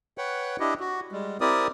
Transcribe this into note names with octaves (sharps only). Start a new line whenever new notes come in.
B4 C#5 F#5 G5
D4 E4 G4 D#5
F#4
G3 G#3
C4 E4 G4 A#4 D5 D#6